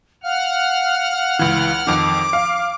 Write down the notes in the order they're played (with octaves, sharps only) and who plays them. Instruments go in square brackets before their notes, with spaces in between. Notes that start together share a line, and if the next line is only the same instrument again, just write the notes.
[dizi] F5 [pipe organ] F#5 F6
[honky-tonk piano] C#2 E3
[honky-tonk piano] F2 D#3 [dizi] D6
[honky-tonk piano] F5